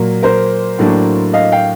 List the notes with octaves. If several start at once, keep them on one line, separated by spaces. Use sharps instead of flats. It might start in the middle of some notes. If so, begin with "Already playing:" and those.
Already playing: A#2 F#3 A#3
A#4 C5
A2 F#3 A#3 D4
D#5 F5
F5 G5